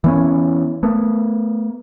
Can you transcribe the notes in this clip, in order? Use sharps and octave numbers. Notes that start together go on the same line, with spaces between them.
E3 B3 C#4
A3 B3